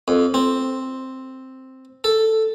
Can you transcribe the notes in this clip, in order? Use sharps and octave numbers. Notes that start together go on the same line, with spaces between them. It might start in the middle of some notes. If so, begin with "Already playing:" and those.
F2
C4
A4